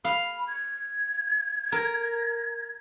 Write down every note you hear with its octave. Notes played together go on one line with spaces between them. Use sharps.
F5 B5
G#6
A#4